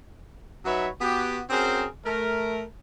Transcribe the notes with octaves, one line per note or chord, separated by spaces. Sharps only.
F#3 D#4 F#4 B4 C#5 E5
B3 F#4 G4
C4 C#4 F#4 G#4 A#4 C5
A3 A#4